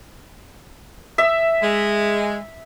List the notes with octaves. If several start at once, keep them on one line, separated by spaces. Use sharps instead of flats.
E5
G#3